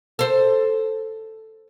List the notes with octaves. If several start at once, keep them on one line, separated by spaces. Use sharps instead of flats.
A4 C5